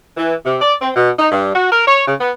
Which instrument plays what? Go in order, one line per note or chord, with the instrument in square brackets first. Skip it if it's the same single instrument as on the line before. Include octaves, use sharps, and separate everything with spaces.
[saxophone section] E3
C3
D5
C4
B2
D#4
G2
F#4
A#4
C#5
C#3
B3